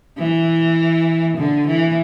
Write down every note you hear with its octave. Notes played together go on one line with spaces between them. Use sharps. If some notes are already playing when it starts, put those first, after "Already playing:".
E3
D3
E3